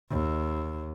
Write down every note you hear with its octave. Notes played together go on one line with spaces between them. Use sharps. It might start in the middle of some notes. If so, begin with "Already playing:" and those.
D#2